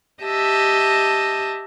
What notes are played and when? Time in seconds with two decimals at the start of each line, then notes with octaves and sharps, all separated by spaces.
0.22 G4 D#5 E5 A5